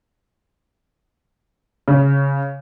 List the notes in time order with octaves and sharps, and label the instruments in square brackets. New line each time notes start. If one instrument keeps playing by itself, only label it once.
[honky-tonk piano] C#3